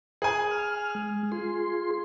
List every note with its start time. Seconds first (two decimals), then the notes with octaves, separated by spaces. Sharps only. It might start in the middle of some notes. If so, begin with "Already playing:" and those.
0.22 G#4 G#5
0.51 F6
0.95 G#3
1.32 F4 G#4 C6